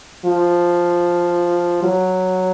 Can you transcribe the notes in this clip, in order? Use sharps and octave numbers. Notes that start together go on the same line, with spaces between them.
F3
F#3